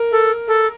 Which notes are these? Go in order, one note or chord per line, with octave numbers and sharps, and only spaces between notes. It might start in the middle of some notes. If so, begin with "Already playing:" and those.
Already playing: A#4
A4
A4